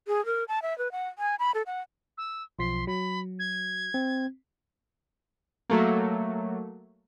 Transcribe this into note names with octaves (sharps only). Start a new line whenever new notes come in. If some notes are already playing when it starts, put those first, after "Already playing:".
G#4
A#4
A5
E5
B4
F#5
G#5
B5
A4
F#5
E6
B1 F3 C6 B6
F#3 B5
G#6
C4
F#3 A3 A#3